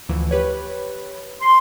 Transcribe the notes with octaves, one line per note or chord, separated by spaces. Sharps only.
D2 E3 F3
G4 B4 C#5
C6